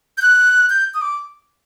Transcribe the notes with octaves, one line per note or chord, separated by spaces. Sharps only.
G6
F#6
G6
D#6
D6